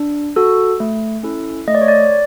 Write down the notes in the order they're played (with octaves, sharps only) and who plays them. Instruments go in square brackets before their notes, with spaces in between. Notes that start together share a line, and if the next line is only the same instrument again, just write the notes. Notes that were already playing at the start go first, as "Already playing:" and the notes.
Already playing: [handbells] D4
F#4 A4
A3
C#4 E4 A4
A3 D#5
D5
C#5
D5